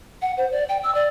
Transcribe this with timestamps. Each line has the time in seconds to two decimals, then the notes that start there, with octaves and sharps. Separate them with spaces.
0.22 F#5
0.37 C5
0.52 D5
0.69 G5
0.83 E6
0.95 D5